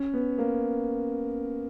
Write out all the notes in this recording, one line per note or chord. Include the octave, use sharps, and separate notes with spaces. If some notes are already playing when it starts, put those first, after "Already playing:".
Already playing: C#4
B3
A#3